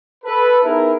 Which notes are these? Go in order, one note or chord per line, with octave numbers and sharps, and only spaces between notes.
A4 B4
B3 D#4 E4 G#4 A#4